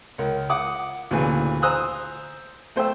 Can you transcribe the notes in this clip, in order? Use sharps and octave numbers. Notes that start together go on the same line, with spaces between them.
C#2 A#4
F#5 D6 D#6
D2 A#2 C#3 E3 B4 G#5
C5 G#5 A#5 D#6 E6 F#6
A3 C5 G5 E6